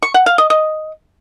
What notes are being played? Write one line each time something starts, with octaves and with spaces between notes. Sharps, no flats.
C#6
F#5
F5
D#5
D#5